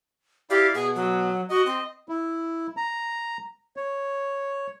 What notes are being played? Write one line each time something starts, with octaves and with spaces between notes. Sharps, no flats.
E4 G4 D5 F5
B2 B3 G#4
F#3
F#4 D#5
C4
E4
A#5
C#5